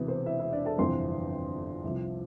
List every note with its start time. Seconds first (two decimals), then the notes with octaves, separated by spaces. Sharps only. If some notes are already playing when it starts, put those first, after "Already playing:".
Already playing: E1 E2 C3 B4
0.08 C5
0.26 E4 E5
0.39 E4 E5
0.52 D4 D5
0.65 A4 A5
0.78 G1 F2 C3 E3 C5 C6
1.84 C2 C3 F3